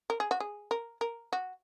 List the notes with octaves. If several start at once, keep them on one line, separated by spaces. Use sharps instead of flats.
A#4
G#4
F#4
G#4
A#4
A#4
F#4